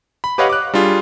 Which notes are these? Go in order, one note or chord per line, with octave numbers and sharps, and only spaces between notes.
B5
G4 B4 C#5 D#5 F5 F#5
D6 F#6
G3 D4 F4 G#4